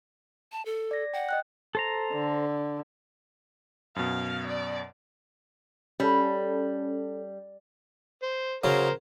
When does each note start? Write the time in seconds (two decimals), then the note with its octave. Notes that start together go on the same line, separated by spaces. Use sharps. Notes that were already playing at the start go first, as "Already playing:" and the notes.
0.52 A5
0.65 A4
0.91 D5 A#6
1.14 F#5 G5
1.29 D#5 G5 F#6
1.75 A4 C5 A#5
2.13 D3
3.96 F#2 B2 F5
4.47 D5
6.00 G3 C#4 A4
8.22 C5
8.64 C#3 F#3 C#4 A#4 C5